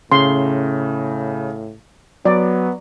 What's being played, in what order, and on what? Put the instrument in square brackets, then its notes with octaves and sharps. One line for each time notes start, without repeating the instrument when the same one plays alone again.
[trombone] A2 [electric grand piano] C#3 [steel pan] C6
[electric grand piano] F#3 [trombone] B3 [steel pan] D5